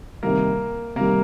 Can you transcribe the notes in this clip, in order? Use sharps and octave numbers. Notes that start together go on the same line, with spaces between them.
C3 D#3 G3 A#3 A#4
C3 D#3 G3 A#3 A#4